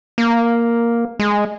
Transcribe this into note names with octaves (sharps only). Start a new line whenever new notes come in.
A#3
G#3